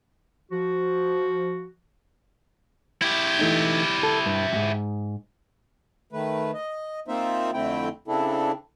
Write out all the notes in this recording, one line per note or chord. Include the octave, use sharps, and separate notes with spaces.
F3 F#4
E4 G4
E3 A3 D#4
A4
G2
F2 G#2
D#3 A3 B4
D#5
A#3 C4 D#4 F4 C5 E5
F2 D3 A3 C4 E4 G5
C#3 C4 D4 E4 A4